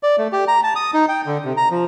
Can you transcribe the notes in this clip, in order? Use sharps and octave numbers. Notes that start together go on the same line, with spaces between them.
D5
A3
G4
A#5
A5
D#6
D#4
G5
D3
C3
A#5
F3